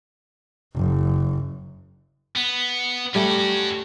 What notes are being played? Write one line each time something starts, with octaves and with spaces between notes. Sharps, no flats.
F#1
B3
G3 A3 C#4 F#4